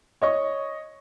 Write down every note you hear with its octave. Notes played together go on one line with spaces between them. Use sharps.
C#5 D#5 C#6